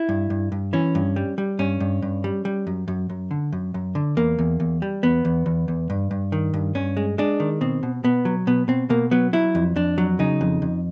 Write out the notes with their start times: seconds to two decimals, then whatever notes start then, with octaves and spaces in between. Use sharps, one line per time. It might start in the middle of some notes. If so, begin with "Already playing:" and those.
Already playing: E4
0.09 G2
0.30 G2
0.52 G2
0.73 E3 C#4
0.95 G2
1.16 G3
1.38 G3
1.59 G2 C#4
1.80 G2
2.02 G2
2.24 G3
2.45 G3
2.67 F#2
2.88 F#2
3.10 F#2
3.31 D3
3.52 F#2
3.74 F#2
3.95 D3
4.17 E2 A#3
4.39 E2
4.60 E2
4.82 G3
5.03 E2 B3
5.25 E2
5.46 E2
5.68 E2
5.90 G2
6.11 G2
6.32 D#3
6.54 G2
6.75 G2 C#4
6.97 G#3
7.18 G#3 D4
7.40 D#3
7.61 B2 C4
7.83 B2
8.04 B2 B3
8.25 F#3
8.47 B2 B3
8.68 B2 C4
8.90 B2 A#3
9.11 F#3 B3
9.33 F#3 E4
9.55 F2
9.76 F2 D4
9.98 F#3
10.19 C#3 D#4
10.41 F2
10.62 F2